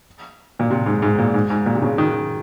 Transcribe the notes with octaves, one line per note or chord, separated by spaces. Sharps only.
A#2
C3
G#2
G#2
A#2
G#2
G#2
A#2
C3
C#3
D#3